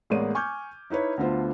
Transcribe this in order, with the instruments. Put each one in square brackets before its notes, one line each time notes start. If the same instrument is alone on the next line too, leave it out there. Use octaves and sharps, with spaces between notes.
[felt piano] A1 G#3 A#3 B3 D5 D#7
G#5 C#6 D6 F6 G6 G#6
D#4 E4 B4 C#5
D2 D3 B3 F4 C5